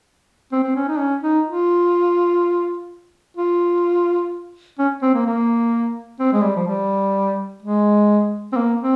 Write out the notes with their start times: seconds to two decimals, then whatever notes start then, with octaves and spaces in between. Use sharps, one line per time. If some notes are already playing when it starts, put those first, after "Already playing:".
0.52 C4
0.64 C4
0.75 C#4
0.88 D#4
0.99 C#4
1.23 D#4
1.47 F4
3.37 F4
4.79 C#4
5.02 C4
5.14 A#3
5.26 A#3
6.20 C4
6.33 G#3
6.44 G3
6.56 F3
6.67 G3
7.63 G#3
8.53 C4
8.57 A#3
8.81 C4